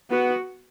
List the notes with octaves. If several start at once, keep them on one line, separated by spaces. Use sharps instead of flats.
B3 F#4